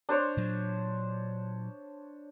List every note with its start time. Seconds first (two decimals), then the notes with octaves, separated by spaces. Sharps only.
0.09 D4 C5 C#5
0.37 A#2 F#3